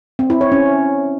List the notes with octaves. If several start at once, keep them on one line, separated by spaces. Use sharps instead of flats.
C4
E4
C#5
C#4